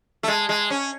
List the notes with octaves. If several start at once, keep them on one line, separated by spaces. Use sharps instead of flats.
A3
G#3
G#3
C#4